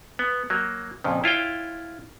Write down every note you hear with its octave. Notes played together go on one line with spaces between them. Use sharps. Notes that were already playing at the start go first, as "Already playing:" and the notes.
B3
F#3 A#3
F2 A#2 C#3
E4 F4 C#5 G5